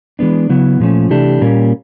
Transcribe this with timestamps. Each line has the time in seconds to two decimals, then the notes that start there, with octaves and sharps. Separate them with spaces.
0.19 E3 G#3 B3 D4
0.49 C#3 F#3 B3 E4
0.80 A#2 F3 A3 C#4
1.10 C3 E3 A3 D4 G4
1.41 A#2 G3 A#3 C#4